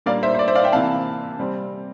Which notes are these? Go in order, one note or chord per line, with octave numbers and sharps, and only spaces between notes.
A#2 G3 A#3 D4 D5 F5
C5 E5
C5
D5
C5 E5
D5 F5
E5 G5
C3 E3 A#3 F5 A5
C3 G3 C4